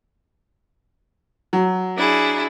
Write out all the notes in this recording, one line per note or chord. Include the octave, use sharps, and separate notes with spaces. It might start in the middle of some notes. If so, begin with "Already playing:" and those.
F#3
D4 E4 G#4